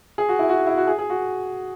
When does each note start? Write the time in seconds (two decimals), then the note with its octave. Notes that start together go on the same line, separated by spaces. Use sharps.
0.18 G#4
0.29 F#4
0.39 E4
0.49 F#4
0.67 E4
0.77 F#4
0.87 G#4
0.98 G#4
1.10 F#4